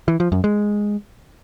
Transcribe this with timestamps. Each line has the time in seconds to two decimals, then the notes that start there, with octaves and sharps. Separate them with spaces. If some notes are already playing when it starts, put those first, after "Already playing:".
0.08 E3
0.20 F3
0.32 F#2
0.44 G#3